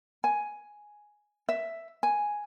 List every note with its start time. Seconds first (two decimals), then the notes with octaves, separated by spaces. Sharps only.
0.24 G#5
1.49 E5
2.03 G#5